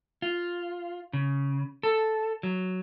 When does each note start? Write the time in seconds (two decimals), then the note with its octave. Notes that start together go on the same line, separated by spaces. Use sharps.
0.22 F4
1.13 C#3
1.83 A4
2.43 F#3